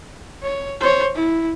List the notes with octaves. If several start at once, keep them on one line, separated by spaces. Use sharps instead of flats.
C#5
C5 C#5
E4